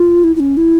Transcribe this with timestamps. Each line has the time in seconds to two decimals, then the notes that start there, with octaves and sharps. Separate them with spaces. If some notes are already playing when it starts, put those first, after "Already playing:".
Already playing: F4
0.24 E4
0.36 E4
0.40 C#4
0.57 E4